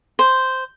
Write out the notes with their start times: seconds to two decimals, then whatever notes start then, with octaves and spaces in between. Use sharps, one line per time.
0.19 C5